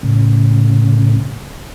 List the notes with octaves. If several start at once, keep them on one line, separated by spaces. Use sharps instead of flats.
A2 C#3